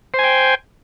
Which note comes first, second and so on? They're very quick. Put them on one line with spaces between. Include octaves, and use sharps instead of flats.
C5 G#5 G5